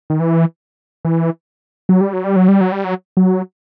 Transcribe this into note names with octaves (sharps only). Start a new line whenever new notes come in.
D#3
E3
E3
F#3
G3
F#3
G3
F#3
G3
F#3
G3
F#3
F#3